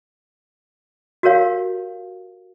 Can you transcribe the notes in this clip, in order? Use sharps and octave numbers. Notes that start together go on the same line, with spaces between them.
F#4 G4 A#4 C#5 F5